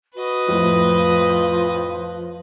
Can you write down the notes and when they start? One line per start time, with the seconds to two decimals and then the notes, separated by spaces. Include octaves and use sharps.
0.16 F#4 B4 D#5
0.48 F2 A2 F3